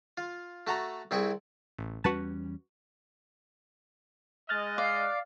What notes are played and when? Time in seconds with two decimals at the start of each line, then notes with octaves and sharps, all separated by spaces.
0.17 F4
0.67 A3 F#4 A4 A#5
1.11 C2 C4 E4 G#4 C#6
1.78 A1
2.04 E2 G3 C#4 F#4 B4 A5
4.49 G#3 D#5 F6 F#6 A6
4.78 D5 F5